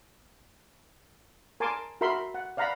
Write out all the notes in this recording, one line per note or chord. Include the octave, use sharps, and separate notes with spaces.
A#4 G#5 A5 C6 D6
F#4 A#4 E5 B5 C6
F#5
D5 F5 F#5 A#5 B5